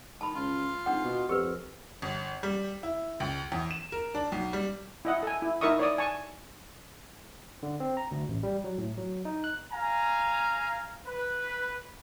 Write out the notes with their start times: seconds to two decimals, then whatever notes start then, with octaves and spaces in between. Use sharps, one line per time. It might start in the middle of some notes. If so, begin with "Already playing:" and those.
0.21 D#3 A5 B5
0.35 C#2 F4
0.86 G#1 D4 F#5
1.04 B2
1.29 F2 G4 A#4 B4
2.02 G1
2.43 G3
2.83 E4
3.20 C#2
3.52 E2
3.71 E7
3.92 A#4
4.15 D4
4.32 B1
4.53 G3
5.05 E4 D#5 F#5
5.23 A4 G#5
5.42 E4
5.61 D#4 E4 A#4 E5 C#6 D#6
5.79 C#5 D5 D#6
5.98 G#5 A5 C#6
7.63 D3
7.80 C4
7.97 A#5
8.11 D2
8.28 A1
8.43 G3
8.64 F#3
8.78 A2
8.98 F#3
9.25 D#4
9.44 F#6
9.73 F5 G#5 A#5
11.06 B4